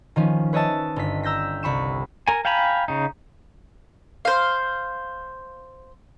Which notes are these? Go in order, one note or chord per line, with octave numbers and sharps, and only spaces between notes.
D#3 F3 C#4
B4 C#5 D#5 E5 A5
G1 B6
A#5 E6 G6 A#6 B6
C2 B5 C#6 E7
A#4 G#5
F5 G5 G#5 A#5 B5
C#3 D#4
C5 F5